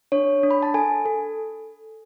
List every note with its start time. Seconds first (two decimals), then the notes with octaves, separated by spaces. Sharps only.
0.12 D4 C#5
0.43 D4
0.51 B5
0.63 A5
0.74 A4 G#5
1.05 A4